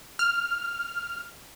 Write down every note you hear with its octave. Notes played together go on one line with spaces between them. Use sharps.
F6